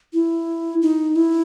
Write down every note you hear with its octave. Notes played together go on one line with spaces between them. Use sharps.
E4
D#4
E4